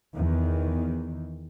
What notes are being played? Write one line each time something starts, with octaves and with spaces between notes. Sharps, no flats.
E2 D#3